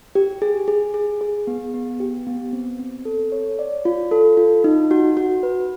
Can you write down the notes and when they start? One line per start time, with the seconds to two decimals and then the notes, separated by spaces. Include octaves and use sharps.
0.15 G4
0.42 G#4
0.68 G#4
0.94 G#4
1.21 G#4
1.47 B3
1.74 B3
2.00 G4
2.27 B3
2.53 C4
2.79 C4
3.05 A4
3.32 C#5
3.59 D5
3.85 F4
4.11 A4
4.37 F4
4.64 D#4
4.91 F#4
5.17 F#4
5.43 B4